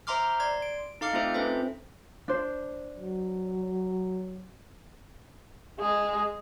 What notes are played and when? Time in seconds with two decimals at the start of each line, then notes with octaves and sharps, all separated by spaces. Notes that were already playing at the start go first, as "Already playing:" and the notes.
0.07 C5 E5 A#5 C6 D6 F6
0.40 D5 C6 G#6
0.62 D7
1.01 D#4 A4 F5 D6 F6 C#7
1.13 A3 C4 D#4 F4 C5 E5
1.34 C4 C#4 A4 B4 C5 E5
2.28 D4 C5
2.96 F#3
5.80 G#3 G#4